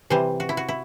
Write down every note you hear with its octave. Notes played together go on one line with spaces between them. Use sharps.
C3 E3 G3 C5
F#4
E4
F#4
E4